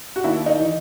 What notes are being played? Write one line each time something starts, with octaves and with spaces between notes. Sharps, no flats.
F#4
D#2 E4
D#4
E3